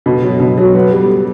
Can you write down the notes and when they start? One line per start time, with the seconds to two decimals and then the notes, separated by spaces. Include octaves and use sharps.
0.06 B2
0.23 F#3
0.40 B2
0.58 F#3
0.75 B3
0.92 G3